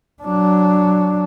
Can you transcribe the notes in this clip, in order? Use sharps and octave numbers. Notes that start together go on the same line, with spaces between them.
F#3 D4